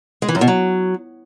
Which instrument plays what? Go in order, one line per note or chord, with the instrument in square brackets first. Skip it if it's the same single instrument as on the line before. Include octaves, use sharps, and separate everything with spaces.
[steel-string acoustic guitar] G#3
E3
F#2
B2
F#3